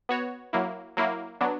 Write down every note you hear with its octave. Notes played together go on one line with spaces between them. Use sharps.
B3 F#4 C#5
F#3 A#3 E4
F#3 A#3 E4
F#3 B3 D4